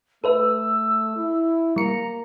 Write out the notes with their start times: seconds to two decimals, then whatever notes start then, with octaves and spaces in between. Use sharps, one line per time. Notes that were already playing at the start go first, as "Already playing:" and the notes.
0.24 A3 A4 B4 E5 E6
1.16 E4
1.76 G3 A#3 A#5 C#7